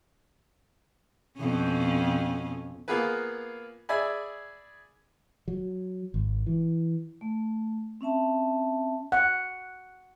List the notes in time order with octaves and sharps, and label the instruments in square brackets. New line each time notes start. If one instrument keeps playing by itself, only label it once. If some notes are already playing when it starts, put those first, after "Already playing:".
[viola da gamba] F2 B2 C#4
[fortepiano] A#3 B3 F4 G#4 B4
G#4 D5 E5 G#5 B5
[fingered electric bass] F#3
G#1
E3
[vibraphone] A3
C4 C#4 E5 A5
[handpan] F#5